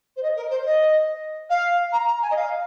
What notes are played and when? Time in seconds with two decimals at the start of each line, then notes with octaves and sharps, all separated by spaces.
0.16 C5
0.23 D#5
0.36 A#4
0.50 C5
0.65 D#5
1.50 F5
1.92 A#5
2.07 A#5
2.22 G#5
2.31 D#5
2.36 F5